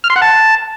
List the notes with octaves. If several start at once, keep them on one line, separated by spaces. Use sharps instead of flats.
F6
C6
F#5
A5